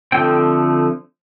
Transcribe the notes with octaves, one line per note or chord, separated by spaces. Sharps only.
D3 F3 A3 C4 G5